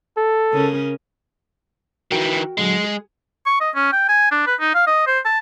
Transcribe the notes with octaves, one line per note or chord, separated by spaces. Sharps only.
A4
C#3 C#4 A#4
D#3 E3 F#4 A#4 G5
A#2 D3 F#3 G#3
G#4
C#6
D#5
C#4
G5
G#5
D4
B4
D#4
F5
D#5
C5
A5